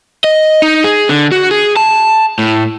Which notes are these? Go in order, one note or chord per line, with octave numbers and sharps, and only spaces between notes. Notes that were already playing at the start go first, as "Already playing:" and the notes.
D#5
D#4
G#4
D3
F#4
G#4
A5
A2